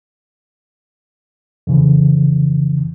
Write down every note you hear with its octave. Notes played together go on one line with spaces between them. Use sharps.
F2 C#3 E3